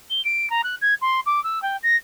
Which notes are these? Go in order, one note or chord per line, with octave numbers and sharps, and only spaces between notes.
G7
D7
A#5
F#6
G#6
C6
D6
E6
G5
A#6